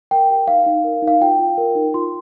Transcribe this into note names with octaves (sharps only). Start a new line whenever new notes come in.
A#4 G5
G4
D#4 F5
D#4
A#4
D#4
F5
F4 G5
F4
A#4
D#4
F4 C6